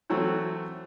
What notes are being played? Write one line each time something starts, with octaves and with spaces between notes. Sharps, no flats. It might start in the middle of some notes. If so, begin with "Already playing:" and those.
E3 F#3 A3 C4 F#4